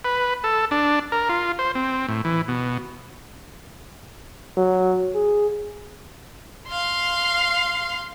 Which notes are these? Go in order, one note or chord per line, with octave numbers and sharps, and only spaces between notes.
B4
A4
D4
A#4
F4
C5
C4
A2
E3
B2
F#3
G#4
F5 C6